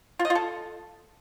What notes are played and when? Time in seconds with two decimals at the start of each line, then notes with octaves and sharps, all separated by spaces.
0.19 F4
0.25 D#5
0.30 F4
0.35 A4